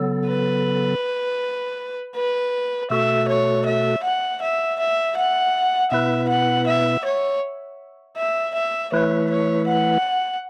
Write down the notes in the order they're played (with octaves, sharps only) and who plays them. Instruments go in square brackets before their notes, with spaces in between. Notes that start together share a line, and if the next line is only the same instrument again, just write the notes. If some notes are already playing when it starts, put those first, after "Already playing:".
Already playing: [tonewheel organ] C#3 F#3 B3 A4
[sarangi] B4
B4
[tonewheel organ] B2 A3 F#4 A4 [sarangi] E5
[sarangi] C#5
E5
F#5
E5
E5
F#5
[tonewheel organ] B2 B3 E4 B4 [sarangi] E5
[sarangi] F#5
E5
C#5
E5
E5
[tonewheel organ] E3 A3 E4 B4 [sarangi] C#5
[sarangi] C#5
F#5